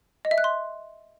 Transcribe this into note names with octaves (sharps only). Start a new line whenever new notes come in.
D#5
E5
F#6
C6